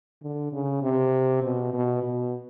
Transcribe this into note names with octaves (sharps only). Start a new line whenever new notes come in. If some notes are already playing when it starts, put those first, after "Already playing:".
D3
C#3
C3
B2
B2
B2